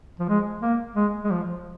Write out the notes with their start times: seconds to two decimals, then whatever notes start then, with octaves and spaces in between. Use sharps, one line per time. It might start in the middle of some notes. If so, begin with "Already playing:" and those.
0.20 F3
0.29 G#3
0.62 A#3
0.96 G#3
1.24 G#3
1.31 F3